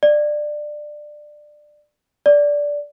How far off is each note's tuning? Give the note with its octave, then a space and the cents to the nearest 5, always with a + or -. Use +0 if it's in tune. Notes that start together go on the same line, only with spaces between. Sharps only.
D5 +20
D5 -10